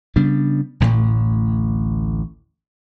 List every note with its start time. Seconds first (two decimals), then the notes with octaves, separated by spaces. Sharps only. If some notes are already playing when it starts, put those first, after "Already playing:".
0.16 C#3 G3 B3 D4
0.80 E1 A1 D2 A2